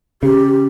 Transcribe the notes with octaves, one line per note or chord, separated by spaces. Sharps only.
C#3 G4